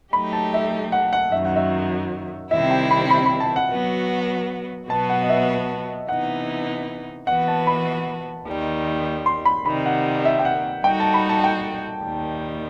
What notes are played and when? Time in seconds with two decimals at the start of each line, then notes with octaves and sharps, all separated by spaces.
0.13 F#3 A3 D#4 G4 B5
0.33 A5
0.54 E5
0.92 F#5
1.13 F#5
1.32 F#2 D#3 F#3 E5
1.45 F#5
1.56 E5
2.51 C3 D#3 G3 C4 E4 E5
2.71 G5
2.91 B5
3.11 B5
3.26 B5
3.40 A5
3.56 F#5
3.71 F#3 B3 F#4
4.89 B2 F#3 B3 F#4 B4 A5
5.09 F#5
5.22 D#5
5.29 E5
6.09 C3 E3 B3 D#4 F#5
7.27 E3 B3 F#4 B4 F#5
7.48 A5
7.67 B5
8.47 D#2 D#3 G3
9.26 C6
9.45 B5
9.65 C3 D#3 G3 B5
9.86 F#5
10.25 E5
10.39 G5
10.45 F#5
10.84 G3 D#4 F#4 A4 G5
11.00 A5
11.14 B5
11.29 A5
11.44 G5
12.04 D#2 D#3 G3